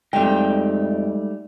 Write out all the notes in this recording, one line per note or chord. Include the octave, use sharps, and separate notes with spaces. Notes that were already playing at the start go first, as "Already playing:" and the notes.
F2 G#2 G3 A3 G5